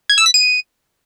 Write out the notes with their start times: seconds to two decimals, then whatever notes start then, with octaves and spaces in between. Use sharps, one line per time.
0.09 G#6
0.18 E6
0.26 B6
0.34 D#7